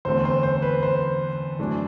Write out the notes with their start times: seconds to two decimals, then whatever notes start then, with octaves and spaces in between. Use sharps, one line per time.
0.05 E2 D3 A3 C4 C5
0.25 C5
0.43 C5
0.62 B4
0.83 C5
1.59 F#2 E3 A3 D4